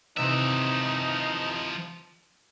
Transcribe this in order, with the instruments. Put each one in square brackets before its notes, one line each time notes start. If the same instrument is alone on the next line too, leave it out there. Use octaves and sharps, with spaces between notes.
[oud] D#2 C3 E3 [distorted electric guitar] F3 E5 [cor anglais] D#4